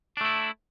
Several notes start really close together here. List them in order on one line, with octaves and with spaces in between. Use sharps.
D4 A3 E4